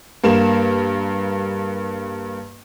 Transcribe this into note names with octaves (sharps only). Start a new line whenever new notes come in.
G2 A#3 E7